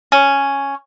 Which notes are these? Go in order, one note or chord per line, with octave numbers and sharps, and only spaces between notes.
C#4